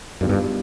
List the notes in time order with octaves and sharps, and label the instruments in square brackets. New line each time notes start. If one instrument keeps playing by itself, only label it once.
[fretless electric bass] F#2 [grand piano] D#3 G3 B3 D4 F4
[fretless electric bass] G2